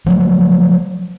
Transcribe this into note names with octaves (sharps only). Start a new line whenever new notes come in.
F3 F#3 A3